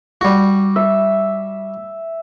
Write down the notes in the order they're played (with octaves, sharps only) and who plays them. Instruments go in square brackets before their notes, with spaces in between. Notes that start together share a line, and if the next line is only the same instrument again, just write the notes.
[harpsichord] G3 F#4
[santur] E5